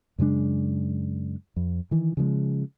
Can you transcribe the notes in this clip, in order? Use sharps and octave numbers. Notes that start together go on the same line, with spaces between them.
F#2 C#3 G#3 D4
F2
D#3 E3
C#3 F3 G3 G#3